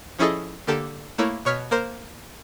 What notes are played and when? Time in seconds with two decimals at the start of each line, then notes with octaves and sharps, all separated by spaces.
0.19 F3 C#4 E4 G#4 A4 D#5
0.67 D3 A#3 G4 A4
1.18 A3 A#3 E4 C#5
1.45 B2 C#5 F6 B6
1.71 A#3 A#4 C5